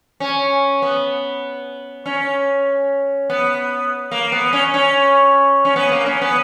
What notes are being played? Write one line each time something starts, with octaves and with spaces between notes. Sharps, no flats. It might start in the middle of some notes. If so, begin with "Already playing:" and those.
C#4
B3
C#4
B3
A#3
B3
C#4
C#4
C#4
B3
A#3
C#4
B3